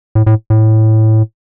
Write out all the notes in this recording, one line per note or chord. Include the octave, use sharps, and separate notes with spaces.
A2
A2
A2